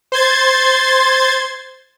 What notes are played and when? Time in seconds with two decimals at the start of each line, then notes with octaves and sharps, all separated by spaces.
0.12 C5 C6 G#6 A6